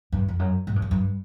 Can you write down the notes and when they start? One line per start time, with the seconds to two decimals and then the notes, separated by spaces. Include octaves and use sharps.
0.12 G2
0.28 F2
0.39 F#2
0.67 G#2
0.76 G2
0.82 F#2
0.91 G2